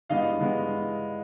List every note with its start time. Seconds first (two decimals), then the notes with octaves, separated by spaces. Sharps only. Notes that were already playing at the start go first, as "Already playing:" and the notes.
0.09 G2 E3 G#3 B3 D#5 F5
0.41 G2 E3 G#3 B3